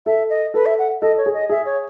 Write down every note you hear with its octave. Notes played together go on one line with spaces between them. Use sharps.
A4 E5
D#5
A4 B4
E5
F#5
A4 D#5
C#5
G#4
D#5
G#4 E5
C#5